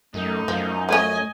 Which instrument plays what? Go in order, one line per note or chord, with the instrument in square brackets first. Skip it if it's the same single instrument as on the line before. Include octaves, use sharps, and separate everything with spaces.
[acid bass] F#2 [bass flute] A3 [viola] D#4
[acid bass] F#2 [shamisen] F3
[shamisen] F3 C#4 [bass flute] A3 [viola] D#5 G#5